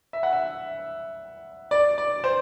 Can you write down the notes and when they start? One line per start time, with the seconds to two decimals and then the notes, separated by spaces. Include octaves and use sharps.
0.13 E5
0.23 F#5
0.33 E5
1.71 D5
1.98 D5
2.24 C5